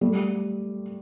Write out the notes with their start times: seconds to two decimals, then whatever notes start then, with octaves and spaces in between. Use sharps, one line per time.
0.01 G3 A3